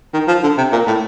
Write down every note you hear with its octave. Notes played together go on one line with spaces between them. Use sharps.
D#3
F3
D3
C3
A#2
A2